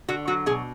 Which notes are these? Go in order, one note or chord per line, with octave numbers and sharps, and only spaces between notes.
D3 F#4
F#3 F#4
B2 G#4